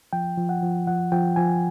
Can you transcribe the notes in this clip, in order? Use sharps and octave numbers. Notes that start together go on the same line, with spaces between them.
F3 G5
F3
F#5
F3
F3 F#5
F3 G5
F3 G#5